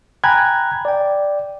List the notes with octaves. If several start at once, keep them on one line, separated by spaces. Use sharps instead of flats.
G5 G#5 A#5 B5 F#6 G#6
D5 G5